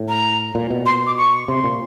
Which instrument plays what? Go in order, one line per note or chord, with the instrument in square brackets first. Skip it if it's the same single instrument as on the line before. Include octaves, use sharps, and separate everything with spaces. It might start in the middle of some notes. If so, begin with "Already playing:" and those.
Already playing: [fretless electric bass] A2
[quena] A#5
[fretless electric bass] A#2
B2
[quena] C6
D6
C#6
[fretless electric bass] C3 [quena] C6
[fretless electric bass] A#2